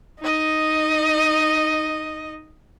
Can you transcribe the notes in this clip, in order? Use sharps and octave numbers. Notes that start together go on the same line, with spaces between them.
D#4 D#5